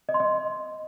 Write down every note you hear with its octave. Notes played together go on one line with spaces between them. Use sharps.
D#5
C6
D#5